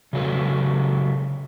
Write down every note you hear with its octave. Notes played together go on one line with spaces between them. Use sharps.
C#3 F#3 A4 B4